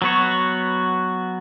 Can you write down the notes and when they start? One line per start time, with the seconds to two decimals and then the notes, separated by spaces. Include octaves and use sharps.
0.02 F#3 B3 F#4 C#5